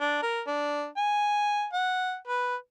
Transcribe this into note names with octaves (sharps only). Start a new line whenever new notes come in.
D4
A#4
D4
G#5
F#5
B4